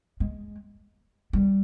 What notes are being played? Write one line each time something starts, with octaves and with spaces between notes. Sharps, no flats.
G#3
G3